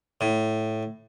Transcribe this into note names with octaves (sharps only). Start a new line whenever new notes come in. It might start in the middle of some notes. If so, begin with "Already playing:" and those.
A2